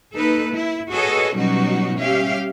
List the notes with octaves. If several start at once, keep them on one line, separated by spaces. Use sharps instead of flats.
A#3 D#4 A4 B4
E4
F#4 G#4 A4 B4 C#5 D#5
B2 F#3 G3 C#4 D#4 F#4
G3 C#4 G4 E5 F5